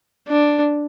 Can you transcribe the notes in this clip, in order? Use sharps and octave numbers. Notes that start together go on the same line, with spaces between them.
D4